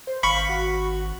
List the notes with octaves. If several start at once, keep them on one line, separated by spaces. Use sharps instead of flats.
C5
G#1 F5 B5 C#6
F#4